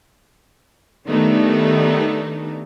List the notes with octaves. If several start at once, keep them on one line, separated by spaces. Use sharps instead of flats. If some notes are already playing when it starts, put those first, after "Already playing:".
D#3 G3 A3 B3 D4 D#4